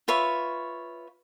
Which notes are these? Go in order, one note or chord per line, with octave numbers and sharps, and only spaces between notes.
F4 B4 C#5 E5